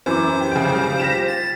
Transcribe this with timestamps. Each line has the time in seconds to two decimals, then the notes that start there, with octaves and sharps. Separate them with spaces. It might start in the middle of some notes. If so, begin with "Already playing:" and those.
0.06 F#2 E3 C5 D6
0.40 G4
0.51 F2 C#3 G#4 G5
0.75 G3 F5
1.00 F4 G4 A#6 B6 E7
1.28 A6